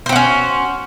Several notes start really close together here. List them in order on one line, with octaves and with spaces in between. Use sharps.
C5 C4 F#4 C#4